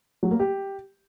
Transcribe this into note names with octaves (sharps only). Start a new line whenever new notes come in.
F#3
A#3
G4